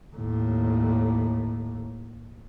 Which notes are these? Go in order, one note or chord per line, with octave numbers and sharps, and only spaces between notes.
D#2 A2